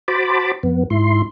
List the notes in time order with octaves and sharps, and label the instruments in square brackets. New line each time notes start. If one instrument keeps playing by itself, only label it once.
[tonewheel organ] F#4 C5 A5 B5 D6
F2 B3
G#2 E4 C6